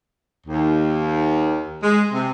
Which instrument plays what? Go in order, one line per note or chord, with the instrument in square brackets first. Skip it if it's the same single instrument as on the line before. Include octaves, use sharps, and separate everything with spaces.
[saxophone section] D#2
G#3
C3